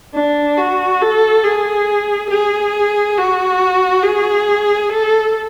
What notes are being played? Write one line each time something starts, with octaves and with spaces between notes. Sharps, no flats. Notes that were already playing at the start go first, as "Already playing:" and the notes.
D4
F#4
A4
G#4
G#4
F#4
G#4
A4